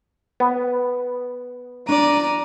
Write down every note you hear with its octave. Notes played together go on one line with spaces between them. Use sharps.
B3
D4 D5 A#5 D#7